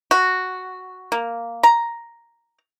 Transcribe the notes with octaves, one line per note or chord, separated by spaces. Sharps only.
F#4
A#3
A#5